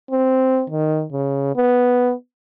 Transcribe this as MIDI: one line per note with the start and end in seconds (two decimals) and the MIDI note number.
0.11 0.63 60
0.70 1.05 51
1.13 1.52 49
1.56 2.12 59